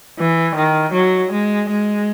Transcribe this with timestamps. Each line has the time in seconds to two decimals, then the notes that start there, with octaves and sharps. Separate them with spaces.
0.18 E3
0.55 D#3
0.93 F#3
1.31 G#3
1.70 G#3